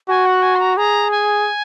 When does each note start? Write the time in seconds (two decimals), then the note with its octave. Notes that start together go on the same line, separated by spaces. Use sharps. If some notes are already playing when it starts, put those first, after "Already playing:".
0.09 F#4 G#5
0.26 F#5
0.43 G#5
0.55 C6
0.60 A#5
0.77 G#4 A#5
1.11 G#5